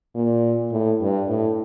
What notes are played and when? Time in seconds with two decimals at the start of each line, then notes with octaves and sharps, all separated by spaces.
0.15 A#2
0.72 A2
1.01 G2
1.29 A2